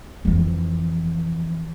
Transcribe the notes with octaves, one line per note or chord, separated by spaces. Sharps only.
F2 E3